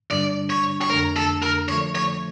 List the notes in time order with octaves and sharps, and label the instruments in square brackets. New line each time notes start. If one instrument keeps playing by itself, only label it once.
[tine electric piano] G2 D3 G3 D4 [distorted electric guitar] D5
[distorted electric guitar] C#5
C#5
[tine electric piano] F2 D3 A3 D4 [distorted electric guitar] A#4
[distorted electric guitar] A4
A#4
[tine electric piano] D3 F3 A3 [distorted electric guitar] C#5
[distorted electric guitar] C#5